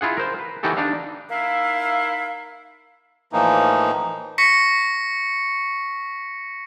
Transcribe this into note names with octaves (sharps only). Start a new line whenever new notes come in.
E4 F4 G#4 F#5
A#4 C5
B4
E3 D#4 F#4 G4 A4
D4 D#4 F5
A#3 D#4 E4 E5 F5
A2 E3 F3 A#3 D#4
C#6 A#6 B6 C#7